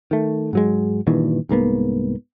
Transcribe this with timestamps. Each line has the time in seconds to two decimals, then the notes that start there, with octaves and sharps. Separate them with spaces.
0.11 D#3 A3
0.53 G#2 F#3 G#3
1.07 G2 A#2 D#3 E3
1.49 C2 G#2 A#3 B3